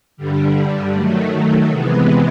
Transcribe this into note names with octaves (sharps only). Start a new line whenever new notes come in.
G2 D3 G3
D#3 F#3 A3
C3 E3 G#3 B3